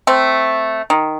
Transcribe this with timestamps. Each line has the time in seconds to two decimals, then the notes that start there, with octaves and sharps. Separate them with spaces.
0.07 A3 C4
0.90 D#3